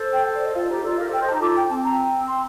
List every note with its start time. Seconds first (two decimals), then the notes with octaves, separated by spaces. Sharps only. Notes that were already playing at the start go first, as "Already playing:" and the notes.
Already playing: A4 C5
0.13 G5
0.34 D5
0.45 D#5
0.55 F4 A4 F5
0.69 D#4 G4 C5
0.84 F4 A4 D5
0.91 D#5
0.98 G4 A#4 F5
1.09 A4 C5
1.13 G5
1.21 C5 D#5
1.28 A5
1.31 D#4 G4
1.42 F4 A4 D6
1.56 G5
1.70 C4 A5
1.84 A#5
2.28 C6